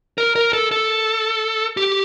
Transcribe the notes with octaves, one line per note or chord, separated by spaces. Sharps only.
A#4
A#4
A4
A4
G4